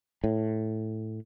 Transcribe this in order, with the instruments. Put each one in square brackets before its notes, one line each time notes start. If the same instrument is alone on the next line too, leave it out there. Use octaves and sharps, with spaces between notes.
[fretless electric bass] A2